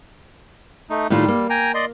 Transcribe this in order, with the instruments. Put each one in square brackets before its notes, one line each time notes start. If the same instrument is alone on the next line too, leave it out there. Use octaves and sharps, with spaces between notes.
[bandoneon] A3 D#4
[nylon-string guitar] A2 D#3 F4 [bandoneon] G3
[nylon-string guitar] A#3
[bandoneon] G5 G#5 A#5
D5 D#5 C6